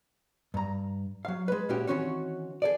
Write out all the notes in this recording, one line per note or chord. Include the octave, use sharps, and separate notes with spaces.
G2 A#5
F#3 F5
G#3 B4
A#2 G#3 C#4 E4 F#4 G4
D#3 E3 C4 C#4 F#4 C#5
G#4 A4 D5